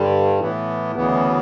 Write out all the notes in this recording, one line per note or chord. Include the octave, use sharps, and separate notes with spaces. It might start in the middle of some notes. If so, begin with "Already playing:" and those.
Already playing: G2 D3 G3
A2 E3 B3
D2 C#3 E3 B3